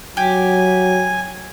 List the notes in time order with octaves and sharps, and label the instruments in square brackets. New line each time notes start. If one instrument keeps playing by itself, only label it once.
[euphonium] F#3 [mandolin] G4 [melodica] G#5